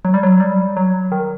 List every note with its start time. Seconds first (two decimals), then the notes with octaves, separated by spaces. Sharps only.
0.05 F#3
0.14 G3
0.23 F#3
0.40 G3
0.77 F#3
1.12 D#3